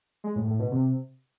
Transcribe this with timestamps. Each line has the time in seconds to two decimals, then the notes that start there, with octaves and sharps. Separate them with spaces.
0.24 G#3
0.36 A2
0.47 A2
0.59 B2
0.71 C3